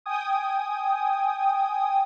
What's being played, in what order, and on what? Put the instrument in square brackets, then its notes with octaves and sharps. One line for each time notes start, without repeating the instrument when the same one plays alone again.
[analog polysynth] G5 G#5 D#6